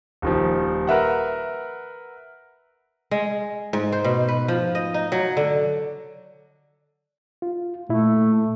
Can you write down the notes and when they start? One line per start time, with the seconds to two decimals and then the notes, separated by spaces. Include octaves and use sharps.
0.22 D#1 D#3 F3
0.87 A#4 B4 E5 F#5
3.11 G#3
3.73 G#2
3.92 C5
4.04 B2
4.28 B4
4.48 F3
4.75 D#5
4.94 D#4
5.12 F#3
5.37 D3
7.42 F4
7.89 A#2 A3 E4